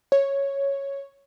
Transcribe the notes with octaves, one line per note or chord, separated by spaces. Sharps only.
C#5